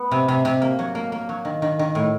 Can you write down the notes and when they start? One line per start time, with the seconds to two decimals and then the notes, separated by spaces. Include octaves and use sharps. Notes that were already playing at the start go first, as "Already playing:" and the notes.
Already playing: B3
0.11 C3
0.28 C3
0.45 C3
0.62 A#3
0.79 F#3
0.95 A#3
1.12 A#3
1.29 F#3
1.45 D#3
1.62 D#3
1.79 D#3
1.95 A2